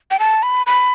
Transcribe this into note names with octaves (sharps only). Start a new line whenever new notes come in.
G5
A5
B5
B5